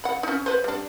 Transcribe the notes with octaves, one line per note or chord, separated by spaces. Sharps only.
F#5 B5
C#4 D#4
B4 C5
G3 D4